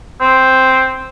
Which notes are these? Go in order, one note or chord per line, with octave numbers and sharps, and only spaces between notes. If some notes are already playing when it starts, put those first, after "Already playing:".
C4